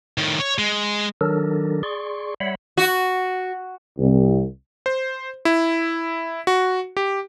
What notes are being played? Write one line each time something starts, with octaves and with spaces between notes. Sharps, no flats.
A2 D#3
C#5
G#3
D#3 F#3 D4 A4 A#4
G#4 D5 C6 C#6
G3 C#5 E5 F#5 B5
F#4
C2
C5
E4
F#4
G4